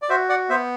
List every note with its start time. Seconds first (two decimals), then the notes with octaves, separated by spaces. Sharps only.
0.02 D5
0.09 F#4 C5 E5
0.29 D5 F#5
0.49 B3 C5 E5